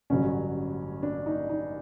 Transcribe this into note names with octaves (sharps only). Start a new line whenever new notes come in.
A1 G2 D3 F#3 C#4
D4
D#4
D#4